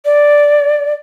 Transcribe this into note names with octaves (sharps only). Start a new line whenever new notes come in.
D5